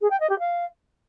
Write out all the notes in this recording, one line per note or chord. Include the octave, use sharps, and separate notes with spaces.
G#4
G5
D#5
G4
F5